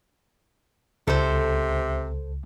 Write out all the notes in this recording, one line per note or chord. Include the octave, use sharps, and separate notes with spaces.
C#2 C3 A4 C5